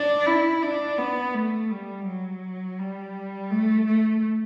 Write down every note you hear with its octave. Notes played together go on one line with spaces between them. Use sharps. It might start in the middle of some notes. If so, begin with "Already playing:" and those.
Already playing: D4
E4
D4
B3
A3
G3
F#3
G3
A3
A3